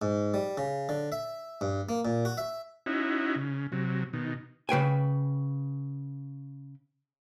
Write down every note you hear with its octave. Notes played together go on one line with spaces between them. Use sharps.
G#2
G3
C#3
D3
E5
G2
A#3
A#2
F#4
E5
C#4 D#4 E4 F#4
C#3
C3 F#3
B2 D#3
C#3 B4 G5 G#5